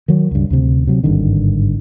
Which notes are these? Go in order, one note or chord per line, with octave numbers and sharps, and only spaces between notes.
D#3 F#3
C#2 G2
D2 C3
C3 F#3
G#1 G2 D3 D#3